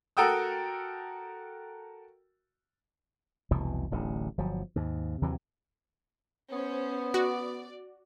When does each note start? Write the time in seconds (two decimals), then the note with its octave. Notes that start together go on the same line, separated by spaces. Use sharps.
0.17 F#4 A4 A#4 G5 D#6 E6
3.51 F1 C2 B2 E3
3.91 D1 A1 D3
4.38 G1 F3 F#3
4.76 D#2 G#2
5.22 D#2 C3 E3 F#3
6.53 B3 C#4 C5
7.14 F#4 D5